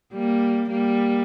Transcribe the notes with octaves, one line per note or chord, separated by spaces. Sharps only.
G3 A#3
G3 A#3